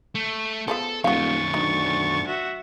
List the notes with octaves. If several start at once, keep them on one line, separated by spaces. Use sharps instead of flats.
A3
F3 G#3 B3 A4
D#1 F#2 D#3 F#4 F5 C#6 A6
D2 D#4
F#4 E5